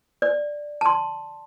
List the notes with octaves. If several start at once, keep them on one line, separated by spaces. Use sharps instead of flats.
D5
A5 C6